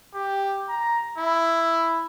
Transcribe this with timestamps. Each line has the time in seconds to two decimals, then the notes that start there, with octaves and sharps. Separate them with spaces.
0.14 G4
0.68 A#5
1.18 E4